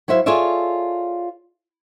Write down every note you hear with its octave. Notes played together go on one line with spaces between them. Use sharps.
F#3 E4 C5 E5 F5
F4 G#4 A4 C#5 D5 E5